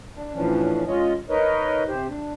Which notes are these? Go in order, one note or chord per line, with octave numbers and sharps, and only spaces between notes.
D4
A2 E3 F3 C#4 D4
G#3 C#4 F4 C#5 D#5
D#4 A#4 B4 C#5 D#5
C3 G4 C5
D4